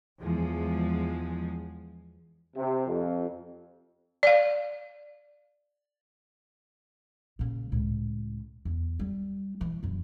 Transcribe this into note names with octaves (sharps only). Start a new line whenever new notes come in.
E2 F3 G#3
C3
F2
D5 F5
A#2 C#3
C#2 A2
E2
G3
E3 E4
D#1 F#2